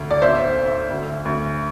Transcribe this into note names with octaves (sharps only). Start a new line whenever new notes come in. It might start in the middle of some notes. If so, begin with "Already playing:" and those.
Already playing: D2
D5
B1 C5 E5
B1
D2
D2